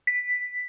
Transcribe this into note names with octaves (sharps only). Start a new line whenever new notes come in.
B6